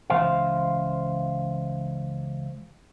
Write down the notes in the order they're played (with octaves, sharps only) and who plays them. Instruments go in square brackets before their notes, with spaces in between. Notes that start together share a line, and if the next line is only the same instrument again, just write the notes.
[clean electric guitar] C#2 F#2 E3 C5 F5